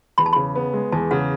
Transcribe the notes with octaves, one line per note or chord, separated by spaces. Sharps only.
E2 B5
A5
C#3 B5
B3
G#3
E2 A5
C#3 F#5